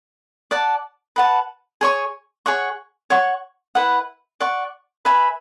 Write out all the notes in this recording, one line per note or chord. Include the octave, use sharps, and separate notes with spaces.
D5 F#5 A5
B4 F#5 A5
G#4 C#5 G#5 C#6
G#4 C#5 F#5 C#6
C#5 F#5 C#6
E4 B4 F#5
D5 F#5 C#6
B4 E5 G#5 B5